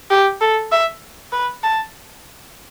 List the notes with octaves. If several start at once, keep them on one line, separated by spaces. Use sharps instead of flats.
G4
A4
E5
B4
A5